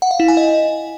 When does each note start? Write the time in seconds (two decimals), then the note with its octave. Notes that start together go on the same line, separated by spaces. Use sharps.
0.02 F#5
0.11 F5
0.20 E4
0.28 G#5
0.37 D#5